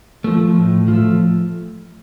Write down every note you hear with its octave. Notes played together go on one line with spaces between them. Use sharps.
F3 A3
A2
F3
A3